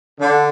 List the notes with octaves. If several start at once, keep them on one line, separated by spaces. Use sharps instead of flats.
D3